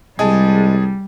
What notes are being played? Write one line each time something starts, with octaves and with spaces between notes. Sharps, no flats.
C2 G3 G#3 G#4 G#5 A5